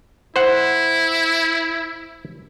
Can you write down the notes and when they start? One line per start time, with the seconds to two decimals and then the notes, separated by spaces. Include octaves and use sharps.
0.36 E4 C5 F#5